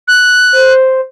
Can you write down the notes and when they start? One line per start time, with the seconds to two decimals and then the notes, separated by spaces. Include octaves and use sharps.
0.08 F#6
0.52 C5